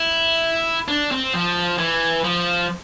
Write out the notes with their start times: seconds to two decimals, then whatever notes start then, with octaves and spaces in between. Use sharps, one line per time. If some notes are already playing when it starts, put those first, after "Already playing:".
Already playing: E4
0.88 D4
1.11 C4
1.34 F3
1.78 E3
2.24 F3